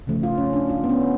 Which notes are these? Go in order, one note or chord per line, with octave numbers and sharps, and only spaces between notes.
C#3 F3 A3
F4
C#4
D4
F4
B3
C#4